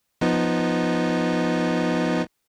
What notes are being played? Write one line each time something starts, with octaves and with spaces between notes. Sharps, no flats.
F3 B3 D#4